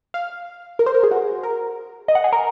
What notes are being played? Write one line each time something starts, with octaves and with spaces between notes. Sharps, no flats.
F5
A#4
C5
A#4
G#4
F#4
A#4
D#5
F#5
G#4
A#4